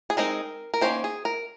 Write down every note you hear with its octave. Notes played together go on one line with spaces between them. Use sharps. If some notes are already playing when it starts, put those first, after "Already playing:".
G#4
G#3 C4 D#4 A#4
A#4
D#3 A#3 C#4 C5
G#4
A#4